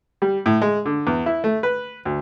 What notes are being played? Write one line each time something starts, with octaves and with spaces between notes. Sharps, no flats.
G3
A2
G#3
D3
E2
E4
A3
B4
D2